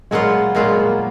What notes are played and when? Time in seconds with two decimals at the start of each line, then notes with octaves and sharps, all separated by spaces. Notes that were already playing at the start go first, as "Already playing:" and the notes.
0.11 A#2 F#3 G#3 B3 F4
0.55 A#2 F#3 G#3 B3 F4
0.77 A#3